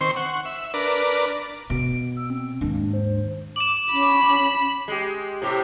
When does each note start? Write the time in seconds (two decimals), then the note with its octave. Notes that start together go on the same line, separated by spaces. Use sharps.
0.01 D#3 C4 C5 C6 C#6
0.16 F#5 C#6
0.45 E5
0.74 D4 A#4 B4 D5
1.70 B2 D7
2.17 E6
2.30 C4
2.61 D#2 G#2 D4
2.93 C5
3.56 D6 E7 F#7
3.92 C#4 B5
4.88 G#3 G4
5.42 A2 C3 G4